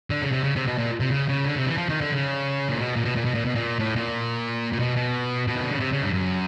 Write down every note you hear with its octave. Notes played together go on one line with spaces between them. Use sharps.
D3
C#3
C3
C#3
C3
B2
A#2
C3
C#3
C#3
D3
C3
E3
F3
D#3
D3
C#3
A#2
B2
A#2
B2
A#2
B2
A#2
B2
A#2
A2
A#2
A#2
B2
B2
B2
D#3
D3
C#3
C3
C#3
G2
F#2